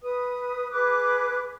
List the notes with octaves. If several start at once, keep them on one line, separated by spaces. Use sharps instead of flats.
B4 D#6
G#4 B4 D6 F#6